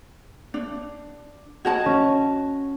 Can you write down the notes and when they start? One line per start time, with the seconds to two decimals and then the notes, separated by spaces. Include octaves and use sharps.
0.54 D4
1.65 F#4 D#5 A5 G#6
1.86 C#4